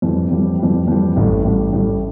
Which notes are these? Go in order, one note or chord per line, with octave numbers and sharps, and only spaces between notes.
F2 E3 G3
F2 E3 G3
F2 E3 G3
F2 E3 G3
A1 A2 G3
A1 A2 G3
A1 A2 G3